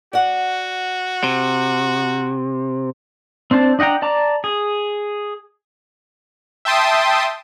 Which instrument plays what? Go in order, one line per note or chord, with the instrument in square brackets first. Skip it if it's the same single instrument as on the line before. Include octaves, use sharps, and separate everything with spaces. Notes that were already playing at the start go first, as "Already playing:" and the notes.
[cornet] F#4 [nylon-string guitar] D5 F#5
[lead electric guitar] C3
[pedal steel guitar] C4 D4 C5 A5
D4 D#5 F#5 G5 A#5
D5 A5 A#5 D6
G#4
[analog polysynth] E5 G5 A5 C6 D#6